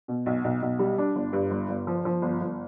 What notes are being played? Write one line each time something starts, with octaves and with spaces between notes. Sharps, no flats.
B2
B1
B1
B1
G3
D4
G1
G2
G1
G1
F3
F3
G1
G1